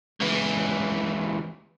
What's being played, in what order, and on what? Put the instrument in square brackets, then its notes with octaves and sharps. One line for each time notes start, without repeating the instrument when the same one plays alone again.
[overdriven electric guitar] C#2 E3